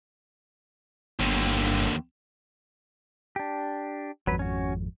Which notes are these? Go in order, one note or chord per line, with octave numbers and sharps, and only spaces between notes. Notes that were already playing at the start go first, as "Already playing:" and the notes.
G1 D#2 D3
D4 G4
G#1 F2 F#3 B4
C#4 F#4